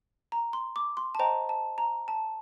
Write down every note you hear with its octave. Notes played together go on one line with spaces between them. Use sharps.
A#5
C6
D6
C6
A5
C5 D#5 G5 A#5
A5
A#5
A5